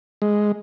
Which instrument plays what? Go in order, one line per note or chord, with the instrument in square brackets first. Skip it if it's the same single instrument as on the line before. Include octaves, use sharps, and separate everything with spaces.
[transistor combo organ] G#3